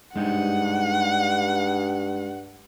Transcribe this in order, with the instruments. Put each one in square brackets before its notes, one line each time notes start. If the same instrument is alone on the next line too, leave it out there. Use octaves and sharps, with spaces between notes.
[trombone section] G2 [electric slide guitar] G#3 D#4 G4 [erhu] F#5